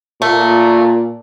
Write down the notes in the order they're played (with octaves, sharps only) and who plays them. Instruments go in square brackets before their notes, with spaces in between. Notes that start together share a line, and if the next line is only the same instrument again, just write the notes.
[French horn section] A#2 [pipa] A3